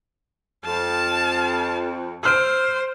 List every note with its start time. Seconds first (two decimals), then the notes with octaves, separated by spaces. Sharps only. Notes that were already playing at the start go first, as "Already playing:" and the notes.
0.65 F2 F5 A5
2.23 C5 E6 F6 D7